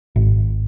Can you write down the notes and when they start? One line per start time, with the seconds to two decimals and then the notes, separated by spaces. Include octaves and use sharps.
0.16 G#1